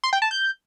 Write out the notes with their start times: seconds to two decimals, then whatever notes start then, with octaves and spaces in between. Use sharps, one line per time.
0.04 C6
0.13 G5
0.22 A5
0.31 G6